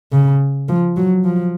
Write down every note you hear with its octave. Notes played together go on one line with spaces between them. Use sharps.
C#3
F3
F#3
F3